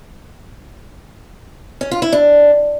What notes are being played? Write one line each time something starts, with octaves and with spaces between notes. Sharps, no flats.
C#4
F4
E4
D4